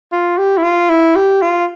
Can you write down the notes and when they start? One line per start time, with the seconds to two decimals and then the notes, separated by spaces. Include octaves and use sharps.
0.12 F4
0.38 G4
0.57 E4
0.63 F4
0.89 E4
1.15 G4
1.42 F4